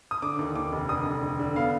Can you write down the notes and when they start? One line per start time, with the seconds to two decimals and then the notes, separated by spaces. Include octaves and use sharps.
0.11 D#6
0.22 D3 D6
0.39 D#2
0.56 D#2 D6
0.72 F1
0.89 D3 D#6
1.05 F1
1.23 D3
1.39 D3
1.56 B3 F5